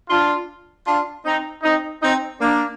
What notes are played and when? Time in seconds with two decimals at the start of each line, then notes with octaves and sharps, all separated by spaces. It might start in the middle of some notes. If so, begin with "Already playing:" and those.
0.10 D4 F4
0.87 D4 F4
1.25 C4 D#4
1.63 C4 D#4
2.02 C4 D#4
2.40 A#3 D4